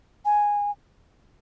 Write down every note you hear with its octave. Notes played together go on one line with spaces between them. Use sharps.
G#5